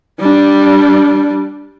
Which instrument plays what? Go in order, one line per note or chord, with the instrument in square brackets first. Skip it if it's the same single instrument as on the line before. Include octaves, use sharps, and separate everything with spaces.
[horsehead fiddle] G3 D4